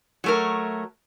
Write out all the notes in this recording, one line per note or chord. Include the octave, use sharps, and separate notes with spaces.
F#3 A3 A#4